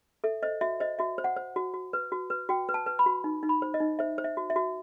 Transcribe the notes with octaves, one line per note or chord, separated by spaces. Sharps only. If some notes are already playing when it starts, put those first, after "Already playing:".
A4 E5
C5 D#5
F#4 E5
C5 D#5
F#4 E5
C5
F#5
C5
F#4
F#4
B4
F#4
B4
F#4 G5
B4
A5
B4
B5
F#4
D#4
D#4
B5
C5
D#5
D#4
C5 E5
C5
E5
F#4
E5
F#4